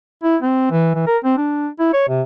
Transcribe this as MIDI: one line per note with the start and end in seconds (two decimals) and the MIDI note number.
0.23 0.37 64
0.42 0.68 60
0.71 0.92 52
0.95 1.04 52
1.07 1.18 70
1.24 1.35 60
1.38 1.67 62
1.79 1.90 64
1.93 2.04 73
2.09 2.22 48